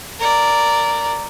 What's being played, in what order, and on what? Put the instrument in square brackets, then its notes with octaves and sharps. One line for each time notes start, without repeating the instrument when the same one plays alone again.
[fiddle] A#4 D5